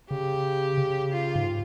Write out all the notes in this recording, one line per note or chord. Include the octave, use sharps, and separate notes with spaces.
C#3 G4
C#3
F4
G#2